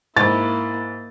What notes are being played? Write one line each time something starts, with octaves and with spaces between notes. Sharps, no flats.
G#2 A#3 E4 A6